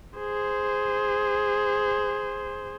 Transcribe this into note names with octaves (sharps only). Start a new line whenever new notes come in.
G#4 C5